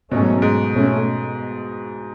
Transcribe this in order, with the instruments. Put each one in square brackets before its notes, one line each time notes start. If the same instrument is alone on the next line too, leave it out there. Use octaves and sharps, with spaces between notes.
[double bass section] G#2 F#3 A3 C#4 [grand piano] B2
[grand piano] G#2
[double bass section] B2 A3 C#4